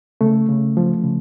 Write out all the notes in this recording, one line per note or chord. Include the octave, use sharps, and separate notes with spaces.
C#3 A3
C#3
F3
C#3